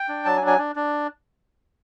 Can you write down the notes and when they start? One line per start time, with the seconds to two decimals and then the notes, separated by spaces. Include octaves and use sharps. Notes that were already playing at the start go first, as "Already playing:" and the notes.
Already playing: G5
0.09 D4
0.25 F#3 A5
0.37 G#5
0.42 D4
0.47 G#5
0.58 D4
0.76 D4